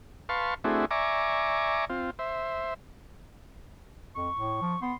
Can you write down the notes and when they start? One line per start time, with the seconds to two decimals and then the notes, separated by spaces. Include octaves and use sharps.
0.29 B4 F5 A5 C6 C#6
0.64 A3 C4 D4 E4 F#4 G#4
0.91 D5 E5 G#5 A#5 C#6 D6
1.89 C4 F4
2.19 C5 E5
4.15 F2 C#6
4.36 A2
4.62 F3
4.82 B3 C6